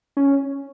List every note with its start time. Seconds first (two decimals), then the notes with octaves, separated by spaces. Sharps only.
0.17 C#4